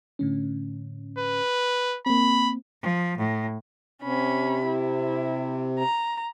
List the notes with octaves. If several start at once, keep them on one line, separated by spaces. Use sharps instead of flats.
A2 D3 C#4
B4
A#3 C4 B5
F3
A2
C3 C#4 B5
E4
A#5